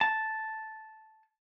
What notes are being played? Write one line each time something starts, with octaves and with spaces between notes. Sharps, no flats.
A5